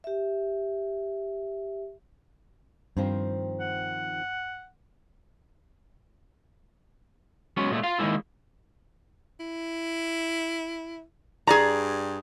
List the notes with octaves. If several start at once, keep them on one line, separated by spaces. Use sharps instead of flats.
G4 E5
G2 D#3 F3 C4
F#5
F#3 G#3 B3 C#4
A#2 G#3 A3
F4 F5
D#3 F#3 G#3 A#3 E4
E4
G2 G#4 D5 A#5